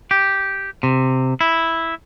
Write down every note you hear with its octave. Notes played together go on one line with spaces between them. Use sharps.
G4
C3
E4